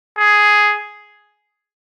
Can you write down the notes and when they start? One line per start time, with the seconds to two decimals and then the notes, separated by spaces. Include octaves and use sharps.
0.18 G#4